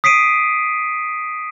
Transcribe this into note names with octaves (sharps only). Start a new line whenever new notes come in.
D#6 B6 C7 D7 D#7